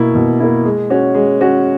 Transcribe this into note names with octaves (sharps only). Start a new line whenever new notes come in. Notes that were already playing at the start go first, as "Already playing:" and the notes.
Already playing: B2 A#3 E4
B2
A#3 E4
G#3
C#4 F#4
G#3
C#4 F#4